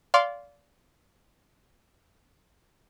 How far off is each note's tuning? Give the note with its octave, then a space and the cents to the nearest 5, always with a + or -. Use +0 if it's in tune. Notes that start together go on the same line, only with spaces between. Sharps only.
D5 -25 F5 +0 C6 +0